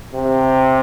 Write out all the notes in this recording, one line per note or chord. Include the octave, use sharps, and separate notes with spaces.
C3